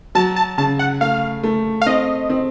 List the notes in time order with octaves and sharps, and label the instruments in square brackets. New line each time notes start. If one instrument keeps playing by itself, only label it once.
[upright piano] F#3 [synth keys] A5
[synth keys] A5
[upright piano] C#3 [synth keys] A5
[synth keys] F#5
[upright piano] A3 [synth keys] F5
[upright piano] A3
[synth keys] F5
[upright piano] C4 [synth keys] D#5
[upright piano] C4